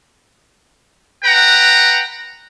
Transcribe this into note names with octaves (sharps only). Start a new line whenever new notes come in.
B4 F#5 G5 A#5